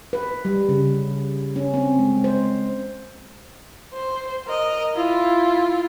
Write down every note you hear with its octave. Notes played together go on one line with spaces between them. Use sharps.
B4
G3
C#3
C#4
C4
G#3
C5
C5
A#4 D#5
E4 F4